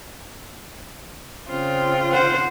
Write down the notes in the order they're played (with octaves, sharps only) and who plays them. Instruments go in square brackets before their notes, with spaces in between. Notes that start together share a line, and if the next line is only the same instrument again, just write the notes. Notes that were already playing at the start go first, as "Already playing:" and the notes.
[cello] C#3 F4 [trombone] C4
[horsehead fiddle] C5 F#5